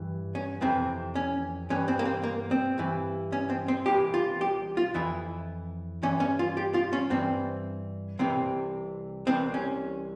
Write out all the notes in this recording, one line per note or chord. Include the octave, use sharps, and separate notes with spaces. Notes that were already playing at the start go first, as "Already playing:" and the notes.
Already playing: G2 E3
C#4
F2 C3 E3 C4
C#4
G2 E3 C#4
C4
A#3
C4
A#3
C4
G2 E3
C#4
C4
C4
C2 C3 E3 G4
F4
G4
F4
F2 E3 E4
G2 E3 C#4
C#4
F4
G4
F4
C#4
G2 E3 C4
C2 C3 E3 C4
C2 C3 E3 C4
C#4